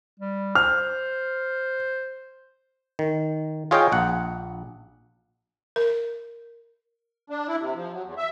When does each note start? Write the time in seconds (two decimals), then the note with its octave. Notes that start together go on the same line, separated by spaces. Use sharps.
0.20 G3
0.55 C5 F6
2.99 D#3
3.71 F4 G#4 C#5 D#5 F5 G5
3.92 A#1 F#5
5.76 A#4
7.30 D4
7.48 E4
7.60 C3
7.75 F3
7.92 F#3
8.05 E2
8.18 E5